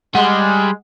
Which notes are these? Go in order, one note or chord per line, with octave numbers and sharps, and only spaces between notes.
G3 G#3 F#5